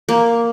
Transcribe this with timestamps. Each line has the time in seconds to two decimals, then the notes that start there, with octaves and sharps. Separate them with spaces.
0.09 A#3